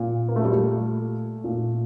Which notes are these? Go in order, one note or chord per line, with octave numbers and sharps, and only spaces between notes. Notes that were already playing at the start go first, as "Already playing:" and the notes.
Already playing: A#2
A#3
A3
G3
A3
A#2